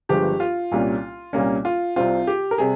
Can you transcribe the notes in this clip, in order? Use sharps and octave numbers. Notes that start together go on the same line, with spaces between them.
G1 G2 F3 G#3 G4
F4
C2 A#2 G3 A#3 C#4
C2 A#2 G3 A#3 C#4
F4
C2 C3 G3 C4 F4
G4
A#4
C3 G3 G#4